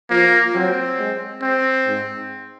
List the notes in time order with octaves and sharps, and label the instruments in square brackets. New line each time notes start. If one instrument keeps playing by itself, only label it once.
[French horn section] F3 [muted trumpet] A#3
[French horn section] F#3 [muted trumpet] C4
[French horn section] G#3
[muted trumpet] C4
[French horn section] G#2